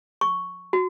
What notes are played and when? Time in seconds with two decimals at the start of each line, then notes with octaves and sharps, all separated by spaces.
0.21 C#6
0.73 F#4